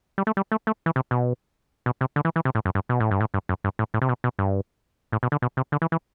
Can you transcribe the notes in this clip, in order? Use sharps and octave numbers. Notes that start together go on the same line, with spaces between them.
G3
A3
G3
A3
A3
E3
C3
B2
B2
C3
D3
E3
E3
C3
A2
F#2
G2
B2
A2
G2
A2
G2
F#2
G2
A2
A2
C3
B2
B2
G2
A2
B2
D3
B2
C3
D3
E3
E3